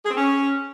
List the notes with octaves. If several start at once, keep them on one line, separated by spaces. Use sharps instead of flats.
G#4
C4
C#4